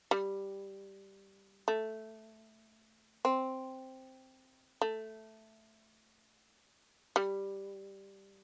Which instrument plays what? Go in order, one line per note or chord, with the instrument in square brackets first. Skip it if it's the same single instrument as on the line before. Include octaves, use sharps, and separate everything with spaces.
[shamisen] G3
A3
C4
A3
G3